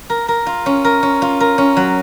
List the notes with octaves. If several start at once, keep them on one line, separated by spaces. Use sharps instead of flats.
A#4
A#4
F4
C#4
A#4
C#4
F4
A#4
C#4
F#3